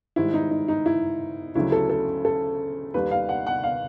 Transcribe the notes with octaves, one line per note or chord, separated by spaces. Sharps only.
G#2 D#3 G3 E4
D#4
D#4
D#4
E4
D2 C#3 F#3 E4
A4
A4
A4
D#2 D#3 G3 B4
F5
F#5
F#5
F5